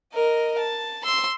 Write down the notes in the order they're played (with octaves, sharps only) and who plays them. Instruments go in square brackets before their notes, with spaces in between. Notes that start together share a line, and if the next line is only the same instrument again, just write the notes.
[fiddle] A#4 D#5
A5
C6 E6